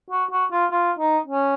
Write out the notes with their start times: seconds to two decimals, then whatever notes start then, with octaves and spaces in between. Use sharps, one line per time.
0.10 F#4
0.31 F#4
0.51 F4
0.72 F4
0.99 D#4
1.26 C#4